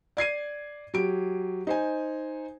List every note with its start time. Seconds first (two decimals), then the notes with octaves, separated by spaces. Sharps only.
0.17 D5 G#6 C7 D#7
0.94 F#3 G4 D7
1.67 D#4 C5 G#5